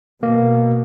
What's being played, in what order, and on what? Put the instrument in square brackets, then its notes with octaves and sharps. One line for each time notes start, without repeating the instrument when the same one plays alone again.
[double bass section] B2 [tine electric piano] A#3